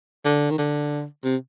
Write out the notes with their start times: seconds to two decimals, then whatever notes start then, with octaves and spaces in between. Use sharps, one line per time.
0.25 D3
0.50 D#3
0.58 D3
1.24 C3